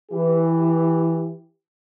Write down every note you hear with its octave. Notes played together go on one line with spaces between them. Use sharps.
E3 G4